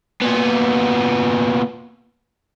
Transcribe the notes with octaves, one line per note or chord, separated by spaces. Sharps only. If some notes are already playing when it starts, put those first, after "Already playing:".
A#2 B3